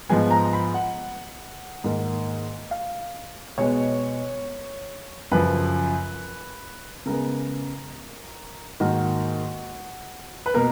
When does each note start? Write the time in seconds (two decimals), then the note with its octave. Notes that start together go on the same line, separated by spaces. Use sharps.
0.09 G#2 F3 G#3 B3 G#5
0.31 A#5
0.53 B5
0.74 F#5
1.84 G#2 D#3 A#3
2.71 F5
3.58 B2 G#3 B3 C#5
5.32 F#2 C#3 F3 B4
7.06 C#3 G#3 B3 A#4
8.80 G#2 D#3 A#3 F#4
10.46 B4
10.54 B2 A#3 A#4